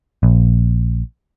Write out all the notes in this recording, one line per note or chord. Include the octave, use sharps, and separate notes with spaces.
A#1